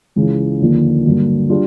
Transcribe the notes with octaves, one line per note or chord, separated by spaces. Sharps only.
C#2 C#3 E3
D#2 D3 F3 A#3
G2 D3 F#3 A#3
G3 D4 F4